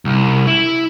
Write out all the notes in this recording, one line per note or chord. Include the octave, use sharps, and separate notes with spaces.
C2
E4